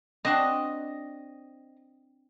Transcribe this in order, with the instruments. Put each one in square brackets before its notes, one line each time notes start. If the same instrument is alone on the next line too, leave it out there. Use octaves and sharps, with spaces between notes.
[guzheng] C4 D4 F#4 [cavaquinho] D#5